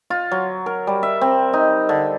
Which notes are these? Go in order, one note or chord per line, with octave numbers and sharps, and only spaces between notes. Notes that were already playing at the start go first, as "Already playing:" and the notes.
F4
F#3
A#4
G3
E5
C4
D#4
D3